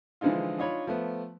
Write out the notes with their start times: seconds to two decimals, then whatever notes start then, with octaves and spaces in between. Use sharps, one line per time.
0.21 D3 E3 F3 G#3 D#4 F4
0.58 D4 D#4 F4 C#5 B5
0.87 F3 A3 B3